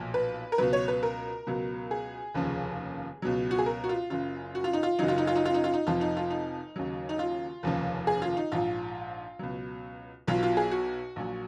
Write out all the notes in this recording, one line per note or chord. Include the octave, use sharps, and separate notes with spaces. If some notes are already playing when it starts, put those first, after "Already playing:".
Already playing: B1 A#2 F3
B4
A#4
C#2 B2 F#3 B4
C#5
B4
A#4
C#2 B2 F#3
G#4
F1 D#2 C#3 F3
C#2 B2 F#3
F#4
G#4
A#4
F#4
F4
F#1 F#2 C#3 F4
F#4
F4
D#4
F4
F#1 F#2 C#3 F#3 D#4
F4
D#4
F4
D#4
F4
D#4
F4
D#4
F1 F2 F3 F4
D#4
F4
D#4
D#2 C#3 F#3
D#4
F4
F1 D#2 C#3 F3
G#4
F4
D#4
A#1 G#2 F3 F4
C#2 B2 F#3
B1 B2 F#3 F4
F4
G#4
F#4
A#1 A#2 F#3